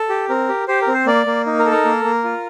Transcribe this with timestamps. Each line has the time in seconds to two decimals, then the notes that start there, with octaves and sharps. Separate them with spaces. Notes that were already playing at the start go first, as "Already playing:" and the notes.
Already playing: A4
0.09 G4
0.29 C4 A#4
0.49 G4
0.68 G4 C5
0.82 A#4
0.88 C4
0.94 C5
1.06 A#3 D5
1.26 A#3
1.46 D#4
1.59 A#4
1.66 A4
1.71 A#4
1.85 A#3
2.04 A#3
2.24 F4